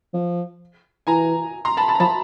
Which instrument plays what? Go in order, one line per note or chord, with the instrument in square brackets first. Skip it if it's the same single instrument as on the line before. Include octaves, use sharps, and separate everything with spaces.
[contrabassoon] F3
[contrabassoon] E3 [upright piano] G#5 A#5
[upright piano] A#5 C6
A5 B5
A5 B5
A#5
[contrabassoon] F3 [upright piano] A5 B5